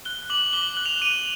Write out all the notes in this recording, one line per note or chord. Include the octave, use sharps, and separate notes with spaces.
F#6 G7
D6 F#7
D6 G7
F#7
F#6
F7
D6 D#7